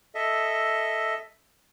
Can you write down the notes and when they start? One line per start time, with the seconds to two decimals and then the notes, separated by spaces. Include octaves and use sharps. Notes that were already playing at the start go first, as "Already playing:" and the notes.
0.15 A4 D#5 E5